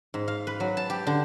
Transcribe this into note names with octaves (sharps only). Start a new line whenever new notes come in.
G#2
F5
B4
F#3
A5
G4
D3